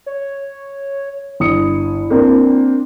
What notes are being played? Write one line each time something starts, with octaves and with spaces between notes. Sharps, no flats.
C#5
G1 E4 D#6 C#7
A#3 C4 D4